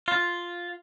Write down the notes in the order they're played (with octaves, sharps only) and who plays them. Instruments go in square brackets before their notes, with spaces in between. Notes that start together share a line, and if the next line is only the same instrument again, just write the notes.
[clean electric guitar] F4